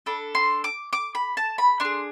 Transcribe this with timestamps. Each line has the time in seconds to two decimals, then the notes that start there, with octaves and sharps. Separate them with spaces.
0.06 D4 A4 B5
0.35 C6
0.64 D6
0.93 D6
1.15 B5
1.37 A5
1.58 B5
1.80 D4 G#4 C6